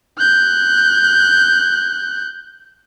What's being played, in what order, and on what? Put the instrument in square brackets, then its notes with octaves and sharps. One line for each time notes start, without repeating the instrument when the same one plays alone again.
[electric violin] F#6 G6